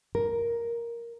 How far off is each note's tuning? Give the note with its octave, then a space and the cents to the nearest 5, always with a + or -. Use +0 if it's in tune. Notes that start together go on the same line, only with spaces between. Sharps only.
A#4 +5